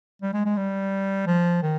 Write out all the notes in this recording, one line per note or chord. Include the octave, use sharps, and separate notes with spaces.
G3
G#3
G#3
G3
F3
D#3